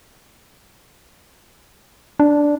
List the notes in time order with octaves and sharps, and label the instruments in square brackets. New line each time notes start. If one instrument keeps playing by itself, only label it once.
[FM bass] D4